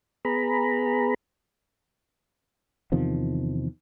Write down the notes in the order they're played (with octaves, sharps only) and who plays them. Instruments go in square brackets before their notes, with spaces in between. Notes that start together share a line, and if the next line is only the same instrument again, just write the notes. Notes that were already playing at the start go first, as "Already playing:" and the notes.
[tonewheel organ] B3 G#4 A#5 B5
[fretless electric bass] E2 C3 D#3 F3